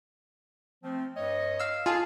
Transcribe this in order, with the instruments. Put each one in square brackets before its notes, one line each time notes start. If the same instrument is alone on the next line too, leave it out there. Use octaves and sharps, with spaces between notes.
[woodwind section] F3 A3 C4
G2 C#5 D#5
[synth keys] F5 E6
[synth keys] F4 G#4 F5 [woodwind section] A4 G#5 A5